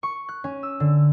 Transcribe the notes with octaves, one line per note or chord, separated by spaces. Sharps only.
C#6
F#6
C#4
E6
D3